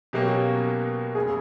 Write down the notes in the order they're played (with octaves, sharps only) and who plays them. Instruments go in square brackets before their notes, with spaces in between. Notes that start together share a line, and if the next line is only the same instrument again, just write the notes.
[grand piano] B2 F#3 A#3 C#4 [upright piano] G4
[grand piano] F1 C#3 [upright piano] G#4